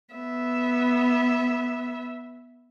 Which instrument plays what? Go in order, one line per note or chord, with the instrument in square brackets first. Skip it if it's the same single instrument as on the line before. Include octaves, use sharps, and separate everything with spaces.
[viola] B3 E5